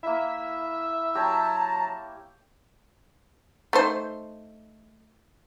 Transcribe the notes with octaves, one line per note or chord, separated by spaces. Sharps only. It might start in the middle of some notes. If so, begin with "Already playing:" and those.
A#3 E4 E5
F#3 G4 C#5 A5 A#5
A3 D#4 C5